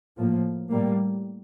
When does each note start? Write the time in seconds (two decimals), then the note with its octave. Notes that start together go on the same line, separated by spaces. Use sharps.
0.17 A2 F3 A#3
0.70 A2 G3 A#3